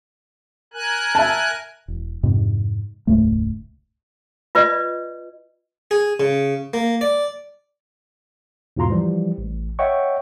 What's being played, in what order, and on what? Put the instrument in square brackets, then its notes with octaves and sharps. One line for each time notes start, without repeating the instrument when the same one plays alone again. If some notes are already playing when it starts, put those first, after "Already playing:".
[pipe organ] A#4 G#5 F#6
[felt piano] E5 A5
[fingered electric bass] E1
F2 G#2 C3
E1 C#2 G#2 A3
[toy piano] F4 B4 D5 D#5
[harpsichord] G#4
C#3
A#3
D5
[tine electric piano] E2 G#2 B2 F4 A#5 C6
E3 F3 G3
A1
C#5 D#5 E5 F#5 G5 C#6